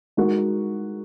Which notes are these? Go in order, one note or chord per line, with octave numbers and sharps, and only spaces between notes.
G#3 D#4 F#4 A#4